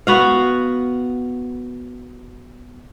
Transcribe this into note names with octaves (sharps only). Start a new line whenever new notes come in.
B3 F#4 F5